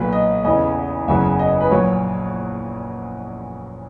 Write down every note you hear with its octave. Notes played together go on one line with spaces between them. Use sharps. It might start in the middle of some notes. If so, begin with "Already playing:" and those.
Already playing: B1 A#2 F#3 B4
D#5
E2 C#3 E3 D#5
F#1 E2 C#3 F#3 E5
D#5
B4
A#1 A#2 F#3 C#5